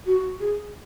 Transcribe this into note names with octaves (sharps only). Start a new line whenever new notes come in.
F#4
G#4